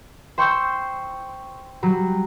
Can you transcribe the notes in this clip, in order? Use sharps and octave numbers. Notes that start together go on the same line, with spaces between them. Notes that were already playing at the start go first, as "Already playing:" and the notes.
C5 G5 C6 C#6 E6 G6
F#3 G3